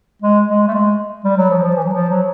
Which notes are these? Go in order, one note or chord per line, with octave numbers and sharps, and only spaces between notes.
G#3
G#3
A3
G#3
G3
F#3
F3
F3
E3
F#3
F3
F#3